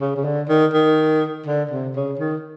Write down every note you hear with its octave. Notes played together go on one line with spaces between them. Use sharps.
C#3
C#3
D3
D#3
D#3
D3
C3
C#3
D#3